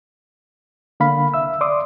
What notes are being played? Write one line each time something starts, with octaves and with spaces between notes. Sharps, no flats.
D3 A#3 F5 B5
C2 E5 E6
D5 C6 D6 D#6